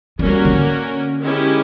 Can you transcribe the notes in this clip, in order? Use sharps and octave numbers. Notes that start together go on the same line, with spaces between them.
G3 A#3 C#4 F#4 A#4
D3
D#3 G#3 C#4 E4 G4